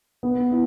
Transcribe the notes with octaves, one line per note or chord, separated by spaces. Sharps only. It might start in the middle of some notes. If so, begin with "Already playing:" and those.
B3
E4